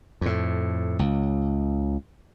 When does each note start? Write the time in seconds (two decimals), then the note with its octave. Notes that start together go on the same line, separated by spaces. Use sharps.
0.21 F2 A2
0.99 C#2